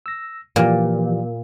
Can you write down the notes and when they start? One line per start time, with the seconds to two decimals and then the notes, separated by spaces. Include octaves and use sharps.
0.06 E6 A#6
0.56 A#2 E3 F3 G4